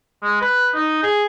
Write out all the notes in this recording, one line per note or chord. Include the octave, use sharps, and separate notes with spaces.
G#3
B4
D#4
G#4